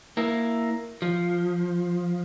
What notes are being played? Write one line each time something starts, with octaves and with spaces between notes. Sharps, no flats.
A#3 E4
F3